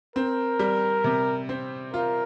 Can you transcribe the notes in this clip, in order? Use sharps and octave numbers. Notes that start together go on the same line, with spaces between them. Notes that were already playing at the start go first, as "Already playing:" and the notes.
C4 A#4
G3
C3
C4
F4 A#4